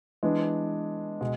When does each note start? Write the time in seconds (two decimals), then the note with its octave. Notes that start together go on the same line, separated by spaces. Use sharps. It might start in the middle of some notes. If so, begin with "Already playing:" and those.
0.23 E3 G#3 B3 D4
1.21 B2 G#3